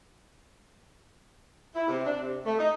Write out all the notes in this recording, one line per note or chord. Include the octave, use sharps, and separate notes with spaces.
E4
C3
D4
C3
A3
D#4